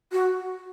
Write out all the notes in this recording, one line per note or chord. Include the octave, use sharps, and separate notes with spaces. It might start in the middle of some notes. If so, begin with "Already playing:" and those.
F#4